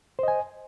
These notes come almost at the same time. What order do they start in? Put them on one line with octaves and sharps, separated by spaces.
C5 D#5 G#5